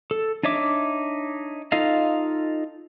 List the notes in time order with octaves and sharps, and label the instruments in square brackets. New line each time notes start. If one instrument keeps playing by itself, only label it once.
[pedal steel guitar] A4
D4 D#4 C#5 E5 D6
D#4 F4 A4 D#5 F5